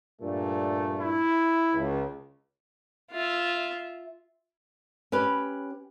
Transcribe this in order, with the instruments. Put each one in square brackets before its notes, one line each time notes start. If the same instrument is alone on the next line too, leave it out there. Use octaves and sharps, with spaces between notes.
[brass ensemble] G2 A#2 A3
[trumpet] E4
[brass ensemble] C#2
[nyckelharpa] F4 E5
[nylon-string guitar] C#4 G4 B4